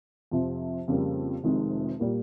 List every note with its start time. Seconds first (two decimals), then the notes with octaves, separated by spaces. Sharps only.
0.31 F2 C3 F3
0.88 F2 C#3 G3 A#3
1.44 F1 F2 C3 D#3 G#3
2.00 A#2 G3 A#3